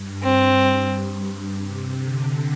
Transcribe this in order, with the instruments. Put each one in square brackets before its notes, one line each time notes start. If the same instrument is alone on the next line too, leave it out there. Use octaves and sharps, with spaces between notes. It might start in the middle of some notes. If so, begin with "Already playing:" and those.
Already playing: [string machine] G2
[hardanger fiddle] C4
[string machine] G2
C3
D3